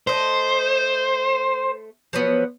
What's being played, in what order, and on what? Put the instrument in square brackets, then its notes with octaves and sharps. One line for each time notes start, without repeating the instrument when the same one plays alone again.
[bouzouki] A3 D#5 [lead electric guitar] C5
[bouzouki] F3 F#3 B3